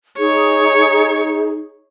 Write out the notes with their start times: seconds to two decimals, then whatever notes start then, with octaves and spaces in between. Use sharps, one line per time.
0.19 D#4 G#4 C#5